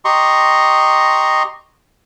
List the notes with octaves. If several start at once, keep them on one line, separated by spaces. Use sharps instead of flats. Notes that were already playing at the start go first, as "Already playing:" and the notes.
G4 D#5 A#5 C6 C#6